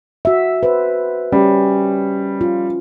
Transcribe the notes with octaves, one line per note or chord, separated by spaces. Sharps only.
F#4 E5
B4 C5
G3 C#4
F4